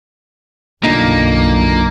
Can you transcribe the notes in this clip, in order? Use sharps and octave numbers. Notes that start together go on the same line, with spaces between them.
F#1 B1 G2 A#2 D3 A#3 D#4